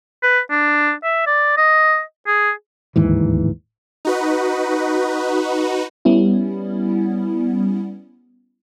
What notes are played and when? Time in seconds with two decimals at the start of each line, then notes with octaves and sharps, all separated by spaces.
0.23 B4
0.50 D4
1.03 E5
1.26 D5
1.57 D#5
2.27 G#4
2.96 D1 D#2 G#2 E3
4.05 D#4 F#4 B4
6.05 G3 B3 C#4 E4